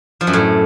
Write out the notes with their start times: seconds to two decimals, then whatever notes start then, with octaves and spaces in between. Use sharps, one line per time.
0.21 F3
0.27 F#2
0.33 A2